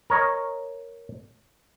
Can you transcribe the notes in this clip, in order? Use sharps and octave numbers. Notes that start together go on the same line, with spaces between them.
A#4 C#5 D#5